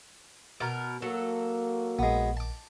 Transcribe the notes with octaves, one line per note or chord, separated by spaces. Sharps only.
B2 A#4 D6
F#3 A#3 A4
A#1 G#3 B3
A5 D6